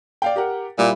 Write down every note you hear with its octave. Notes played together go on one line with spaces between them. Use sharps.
D5 F5 G5
G4 A#4 F#5
A#2 G3 E4